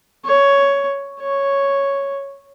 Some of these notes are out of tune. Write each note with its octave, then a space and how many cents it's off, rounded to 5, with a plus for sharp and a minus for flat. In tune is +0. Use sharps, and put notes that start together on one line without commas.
C#5 +10
C#5 +0